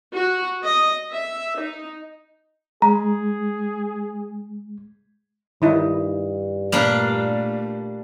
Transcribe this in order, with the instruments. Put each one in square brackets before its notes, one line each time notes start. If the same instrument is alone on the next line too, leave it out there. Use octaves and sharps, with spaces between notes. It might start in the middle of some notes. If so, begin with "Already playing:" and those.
[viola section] F#4
D#5
E5
D#4
[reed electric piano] G#3 [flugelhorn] G#4 [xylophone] A#5
[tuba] G2 [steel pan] D#3 D#4 E4
[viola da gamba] A#2 A3 [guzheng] G3 A#3 D4